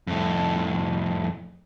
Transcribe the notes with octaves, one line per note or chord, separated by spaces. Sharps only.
F2 A2